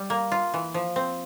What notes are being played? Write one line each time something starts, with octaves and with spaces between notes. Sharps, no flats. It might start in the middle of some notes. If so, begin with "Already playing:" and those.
Already playing: G3
A#3
F4
E3
F3
C4